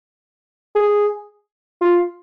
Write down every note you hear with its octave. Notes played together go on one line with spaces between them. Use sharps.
G#4
F4